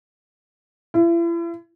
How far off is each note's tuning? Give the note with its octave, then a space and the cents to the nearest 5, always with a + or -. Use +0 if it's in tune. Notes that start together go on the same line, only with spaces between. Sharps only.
E4 +40